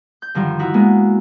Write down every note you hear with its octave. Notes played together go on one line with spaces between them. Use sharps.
G6
G2 D3 D#3 F3 G3
D#4 E4 F#4
G#3 A#3 B3